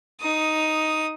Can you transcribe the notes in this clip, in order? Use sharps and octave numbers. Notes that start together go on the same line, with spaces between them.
D#4 D#6